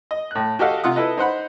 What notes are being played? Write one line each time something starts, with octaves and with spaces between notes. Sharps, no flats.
D#5
A2 F#6
F#4 G4 A4 D#5 F5 F#5
C3 F4 F#5 D#6
E4 A4 B4 D#5
D#4 C5 F#5 B5